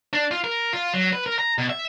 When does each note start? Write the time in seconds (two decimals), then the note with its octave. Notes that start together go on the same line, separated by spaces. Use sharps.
0.13 D4
0.31 F4
0.44 A#4
0.73 F4
0.94 F#3
1.13 B4
1.26 A#4
1.39 A#5
1.58 B2
1.70 E5